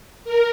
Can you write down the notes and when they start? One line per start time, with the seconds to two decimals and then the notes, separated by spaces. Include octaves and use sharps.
0.25 A#4